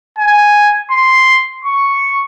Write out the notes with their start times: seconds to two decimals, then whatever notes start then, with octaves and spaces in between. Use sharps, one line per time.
0.18 G#5
0.91 C6
1.65 C#6